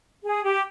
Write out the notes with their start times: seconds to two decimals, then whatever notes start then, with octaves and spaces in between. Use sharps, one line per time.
0.24 G#4
0.43 G4